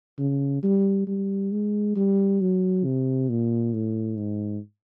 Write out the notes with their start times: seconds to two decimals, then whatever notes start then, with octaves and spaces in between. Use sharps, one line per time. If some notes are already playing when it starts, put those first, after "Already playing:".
0.19 C#3
0.63 G3
1.07 G3
1.52 G#3
1.96 G3
2.41 F#3
2.85 C3
3.29 A#2
3.73 A2
4.18 G#2